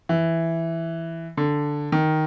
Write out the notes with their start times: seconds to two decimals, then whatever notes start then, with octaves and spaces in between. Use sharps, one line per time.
0.09 E3
1.37 D3
1.92 D#3